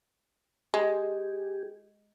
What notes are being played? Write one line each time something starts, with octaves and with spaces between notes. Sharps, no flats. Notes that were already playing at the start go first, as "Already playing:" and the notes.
G#3 G4 G#4